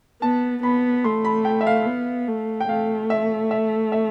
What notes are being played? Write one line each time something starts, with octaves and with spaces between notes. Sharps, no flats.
B3 A5
B3 B5
A3 C6
B5
G5
E5
F5
B3
A3
G5
A3 F5
E5
E5
E5